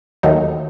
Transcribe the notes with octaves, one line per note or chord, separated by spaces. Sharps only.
D#2 D#3 F#3 A3 D#4